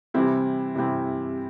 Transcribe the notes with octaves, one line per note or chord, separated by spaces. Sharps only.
C3 E3 G3 C4 E4
C3 E3 G3 C4 E4